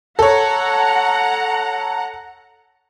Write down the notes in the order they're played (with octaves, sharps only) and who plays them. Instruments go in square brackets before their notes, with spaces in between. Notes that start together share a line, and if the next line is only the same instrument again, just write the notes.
[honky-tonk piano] A4 C#5 [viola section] F#5 A#5